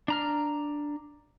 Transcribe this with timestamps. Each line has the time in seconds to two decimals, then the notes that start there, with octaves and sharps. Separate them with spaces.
0.08 D4 A#5 F6